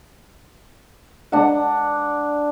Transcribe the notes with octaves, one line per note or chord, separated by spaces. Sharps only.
D4 F#5